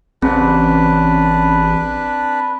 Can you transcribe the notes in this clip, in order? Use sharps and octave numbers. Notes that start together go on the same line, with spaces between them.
A1 C#3 C4 D4 B4